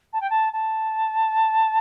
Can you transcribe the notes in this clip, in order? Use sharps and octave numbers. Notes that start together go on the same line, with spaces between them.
A5
G5
A5
A5